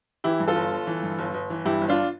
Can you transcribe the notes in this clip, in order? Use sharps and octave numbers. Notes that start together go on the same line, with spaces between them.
E3 E4 G4
G2
F4 A4
G1
G1
E3
G2
G1
G1
E3
G2 E4 G4
G1
D4 F4